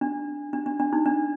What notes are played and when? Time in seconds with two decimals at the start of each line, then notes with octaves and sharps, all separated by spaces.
0.01 D4
0.53 D4
0.66 D4
0.80 D4
0.93 D#4
1.05 D4